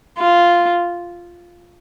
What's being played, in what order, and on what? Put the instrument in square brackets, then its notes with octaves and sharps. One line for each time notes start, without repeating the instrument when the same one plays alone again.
[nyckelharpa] F4